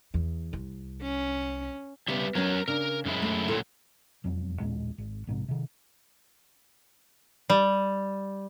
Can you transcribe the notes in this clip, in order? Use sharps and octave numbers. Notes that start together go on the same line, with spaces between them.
E2
C2
C#4
C#3 G3 B3 G4 E5
F#3 C#4 A#4 C#5
C#3 D4 A#4
F#2 G#3 E4
A3
A#2 D3 F#3 E4 F4 A4
E1 F2 F#3
A1 D#2 A#2 G#3
G#1
A#1 G#2 C3
C3 D#3
G3